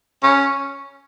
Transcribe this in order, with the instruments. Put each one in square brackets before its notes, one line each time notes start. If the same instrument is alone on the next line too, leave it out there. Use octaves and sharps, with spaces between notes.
[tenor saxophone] C#4